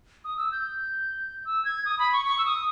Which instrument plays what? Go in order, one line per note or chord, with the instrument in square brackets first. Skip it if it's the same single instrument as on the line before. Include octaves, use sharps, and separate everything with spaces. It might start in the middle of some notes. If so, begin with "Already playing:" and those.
[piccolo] D#6
E6
G6
E6
G#6
D#6
B5
C#6
C#6
E6
D#6